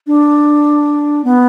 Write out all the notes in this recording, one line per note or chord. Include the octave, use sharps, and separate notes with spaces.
D4
B3